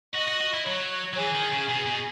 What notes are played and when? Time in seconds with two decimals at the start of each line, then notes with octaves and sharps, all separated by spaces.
0.15 F#4 D#5
0.28 F#4
0.41 F#4
0.53 E4
0.66 F#3 C#5
1.13 F#3
1.18 E3 G#4
1.35 D#3
1.52 C#3
1.69 B2
1.86 B2